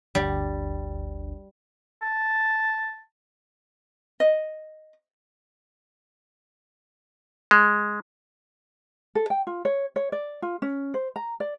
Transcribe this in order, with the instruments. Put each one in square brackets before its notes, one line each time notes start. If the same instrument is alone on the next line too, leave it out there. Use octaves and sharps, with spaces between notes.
[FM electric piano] G1 D2 D4 [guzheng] G3
[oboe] A5
[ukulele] D#5
[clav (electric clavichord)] G#3
[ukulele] A4
G5
F4
C#5
C#5
D5
F4
C#4
C5
A#5
D5